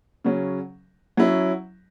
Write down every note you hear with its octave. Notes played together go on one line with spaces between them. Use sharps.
C#3 F#3 C#4
F#3 C#4 E4